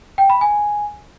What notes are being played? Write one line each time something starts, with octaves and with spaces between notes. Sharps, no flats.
G5
B5
G#5